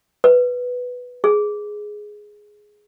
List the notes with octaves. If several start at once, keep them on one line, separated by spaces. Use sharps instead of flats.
B4
G#4